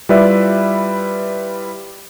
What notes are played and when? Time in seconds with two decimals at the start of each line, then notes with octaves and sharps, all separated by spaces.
0.09 G3 E4 F4 B4 D5 E5